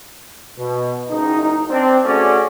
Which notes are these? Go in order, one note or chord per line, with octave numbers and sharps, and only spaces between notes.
B2
F#1 D#4
C4 D4
A3 C#4 F#4 G#4 D5